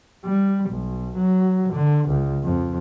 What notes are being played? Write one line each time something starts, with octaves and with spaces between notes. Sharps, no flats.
G3
B1
F#3
D3
C#2
F2